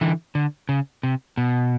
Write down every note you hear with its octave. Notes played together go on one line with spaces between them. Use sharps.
D3 E3
D3
C#3
C3
B2